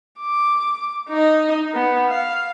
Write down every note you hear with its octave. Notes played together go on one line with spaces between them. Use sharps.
D6
D#4 D#5
B3
F5